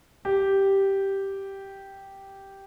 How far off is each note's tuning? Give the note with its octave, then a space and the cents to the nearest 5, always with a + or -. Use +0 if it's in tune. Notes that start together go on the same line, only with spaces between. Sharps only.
G4 -5